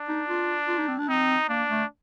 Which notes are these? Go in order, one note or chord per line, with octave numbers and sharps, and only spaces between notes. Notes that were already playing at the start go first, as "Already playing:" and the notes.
Already playing: D4
D#4
F4
F4
D#4
C4
D4
C4 D#4
A#3 D4
A3